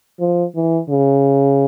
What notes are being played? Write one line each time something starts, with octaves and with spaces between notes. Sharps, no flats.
F3
E3
C#3